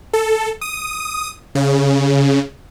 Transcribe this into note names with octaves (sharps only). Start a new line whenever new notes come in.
A4
D#6
C#3